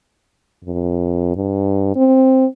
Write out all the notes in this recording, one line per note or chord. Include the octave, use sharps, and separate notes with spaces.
F2
G2
C4